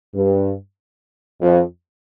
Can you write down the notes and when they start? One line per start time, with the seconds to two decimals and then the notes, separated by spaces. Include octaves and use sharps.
0.15 G2
1.41 F2